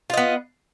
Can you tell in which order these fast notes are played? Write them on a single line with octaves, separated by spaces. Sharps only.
F4 D#5 B3